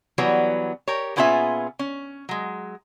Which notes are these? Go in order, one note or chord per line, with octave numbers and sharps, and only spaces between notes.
E3 F#3 G3 B3
G4 A#4 C#5
A#2 B3 C#4 F4 G#4 E5
C#4
F#3 G#3